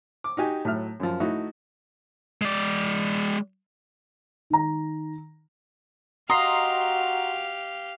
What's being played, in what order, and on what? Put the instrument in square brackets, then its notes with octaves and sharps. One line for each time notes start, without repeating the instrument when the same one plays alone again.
[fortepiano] D6
D#4 F#4 G4 G#5
A2 F#3 E5 F6
F#2 F3
A3 D#4 E4 F#4 A4
[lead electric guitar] G#3 D5
[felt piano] D#3 A#5
[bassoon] F#4 [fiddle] G4 F5 [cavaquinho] D#5 [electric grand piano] A#5 C6 C7